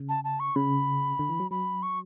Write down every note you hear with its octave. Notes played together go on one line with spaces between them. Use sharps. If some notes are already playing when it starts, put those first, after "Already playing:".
Already playing: C#3
A5
A5
C#6
C#3 B5
D3
E3
F#3
F#3 B5
C#6